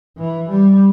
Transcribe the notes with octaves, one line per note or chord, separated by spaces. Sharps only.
E3
G3